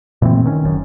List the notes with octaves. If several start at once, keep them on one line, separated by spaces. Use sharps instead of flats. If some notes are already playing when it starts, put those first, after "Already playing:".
A#2 E3 A3 C4
D#3 C#4
F#1 F#2